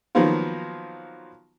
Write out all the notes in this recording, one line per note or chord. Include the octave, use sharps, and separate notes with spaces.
D#3 F3 F#3 A#3 B3 F4